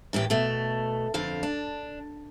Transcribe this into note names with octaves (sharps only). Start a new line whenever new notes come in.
F#2 A2 E3 G4
B2 A3
F2 D3 F5
D4